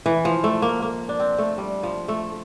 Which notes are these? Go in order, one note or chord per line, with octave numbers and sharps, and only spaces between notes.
E3
F3
A3
A#3
A#3
D4
C4
A3
G3
F3
A3